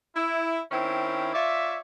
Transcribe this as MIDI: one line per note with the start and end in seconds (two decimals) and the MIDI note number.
0.16 0.59 64
0.71 1.32 51
0.71 1.32 60
0.71 1.32 61
0.71 1.32 64
1.34 1.77 65
1.34 1.77 73
1.34 1.77 74
1.34 1.77 76